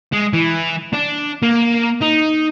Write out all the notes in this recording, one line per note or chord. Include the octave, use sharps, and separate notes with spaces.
G#3
E3
D4
A#3
D#4